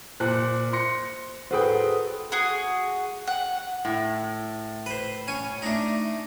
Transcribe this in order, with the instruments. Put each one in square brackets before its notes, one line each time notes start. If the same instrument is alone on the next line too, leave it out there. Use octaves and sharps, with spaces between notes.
[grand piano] A#2 F#6 [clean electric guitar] C5
[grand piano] C6 A#6 C#7
[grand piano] F#4 B4 G5 [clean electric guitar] G#4 A4 C5
[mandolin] F#4 G#4
F#5
[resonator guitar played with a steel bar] A2
[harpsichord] B4 C5
C#4 G#5
[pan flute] A3 [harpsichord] D4 D#4